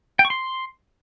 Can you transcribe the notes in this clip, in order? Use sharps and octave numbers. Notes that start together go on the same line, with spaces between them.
G5
C#6
C6